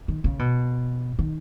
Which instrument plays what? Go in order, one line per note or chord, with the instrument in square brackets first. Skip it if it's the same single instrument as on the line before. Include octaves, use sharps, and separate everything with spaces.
[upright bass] D#3
C#3
B2
D#3